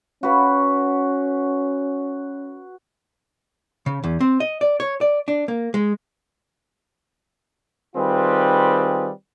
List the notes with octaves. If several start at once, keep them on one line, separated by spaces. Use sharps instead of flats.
C#4 F#4 B4
C#3
E2
C4
D#5
D5
C#5
D5
D4
A#3
G#3
D#3 G3 C4 F4 G#4 B4